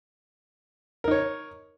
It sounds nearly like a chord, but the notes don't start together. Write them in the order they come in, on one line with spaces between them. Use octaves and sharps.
A#4 D#4 C#5